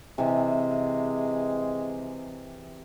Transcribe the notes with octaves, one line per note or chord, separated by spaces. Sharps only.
C3 E3 G#3